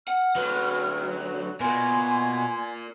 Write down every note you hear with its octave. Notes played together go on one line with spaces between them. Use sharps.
F#5 F6
D2 F#3 B4
B2 F4 A#4 G#5 C6 G#6